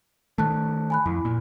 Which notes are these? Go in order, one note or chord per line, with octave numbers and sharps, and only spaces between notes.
D#3 A3 A5 F#6
G#5 B5 F#6
F2 E4
A#2